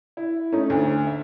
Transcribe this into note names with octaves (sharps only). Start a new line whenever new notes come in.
E4
A3 C#4 D#4
D2
E5